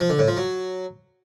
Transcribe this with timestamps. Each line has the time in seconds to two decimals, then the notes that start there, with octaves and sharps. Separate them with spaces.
0.01 F3
0.10 D3
0.19 A2
0.28 F3
0.37 F#3